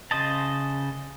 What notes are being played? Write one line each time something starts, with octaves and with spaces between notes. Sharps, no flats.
C#3 C5 D#5 A5